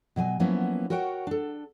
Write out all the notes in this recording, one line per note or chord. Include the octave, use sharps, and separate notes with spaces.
B2 F#3 D#5 G#5
F3 F#3 A#3 B3 C#4 E4
F#4 A#4 C#5 F#5 G5
D4 A4